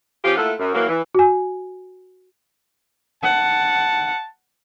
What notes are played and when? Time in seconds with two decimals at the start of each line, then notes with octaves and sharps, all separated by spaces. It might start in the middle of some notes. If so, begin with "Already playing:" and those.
0.24 F3 C#4 F4 G4
0.37 A3 A#3 E4 F4 A4 F#5
0.59 F#2
0.74 E3 F#3 A#3
0.89 E3
1.15 F#4 G#5
3.23 F#5 A5